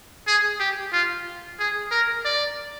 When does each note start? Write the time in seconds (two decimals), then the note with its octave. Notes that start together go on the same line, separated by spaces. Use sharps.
0.27 G#4
0.59 G4
0.92 F4
1.59 G#4
1.91 A#4
2.25 D5